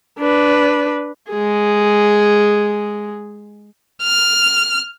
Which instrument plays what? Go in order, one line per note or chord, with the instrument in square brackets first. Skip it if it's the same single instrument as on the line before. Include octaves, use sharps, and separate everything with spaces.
[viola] D4 B4
[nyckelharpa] G#3 G#4
[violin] F6